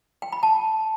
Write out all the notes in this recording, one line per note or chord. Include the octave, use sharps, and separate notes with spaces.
G5
B5
A5